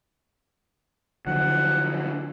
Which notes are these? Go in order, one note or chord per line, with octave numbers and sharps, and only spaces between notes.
D3 F3 F#3 F#5